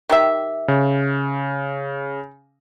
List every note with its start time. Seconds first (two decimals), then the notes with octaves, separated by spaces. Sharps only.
0.09 D#3 G4 E5
0.68 C#3